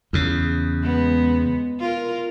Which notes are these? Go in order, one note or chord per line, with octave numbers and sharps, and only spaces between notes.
E2 C#3
G#3 B3
F4 A#4